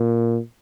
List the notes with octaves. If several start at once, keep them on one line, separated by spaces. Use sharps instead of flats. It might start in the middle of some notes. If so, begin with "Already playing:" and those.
Already playing: A#2